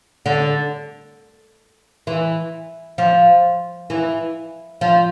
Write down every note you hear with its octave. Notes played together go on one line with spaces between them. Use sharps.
D3
E3
F3
E3
F3